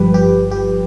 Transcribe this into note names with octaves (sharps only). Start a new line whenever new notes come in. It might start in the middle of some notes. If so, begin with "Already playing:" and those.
Already playing: G1 G2 F3 G4 B4
G4
G4